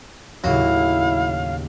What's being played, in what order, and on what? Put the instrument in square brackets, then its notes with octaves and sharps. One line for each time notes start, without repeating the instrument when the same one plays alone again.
[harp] D#2 A2 C#3 [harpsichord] F#3 [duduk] E4 [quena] F5